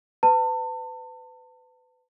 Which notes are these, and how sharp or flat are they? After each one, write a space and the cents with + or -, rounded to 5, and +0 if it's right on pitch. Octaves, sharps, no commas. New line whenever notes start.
B4 +30 A5 +35